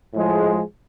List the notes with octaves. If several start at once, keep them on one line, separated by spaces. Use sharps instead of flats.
A2 F3 G#3